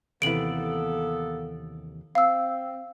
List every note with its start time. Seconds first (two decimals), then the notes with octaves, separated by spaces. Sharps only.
0.22 D#2 C3 E3 A#3 B3 A4 D7 F#7
2.15 C4 F5 E6